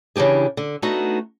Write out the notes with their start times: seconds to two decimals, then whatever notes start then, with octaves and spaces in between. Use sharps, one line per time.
0.16 C#3 E3 D4 G4 G#4
0.57 D3
0.82 A3 B3 D4 D#4 F#4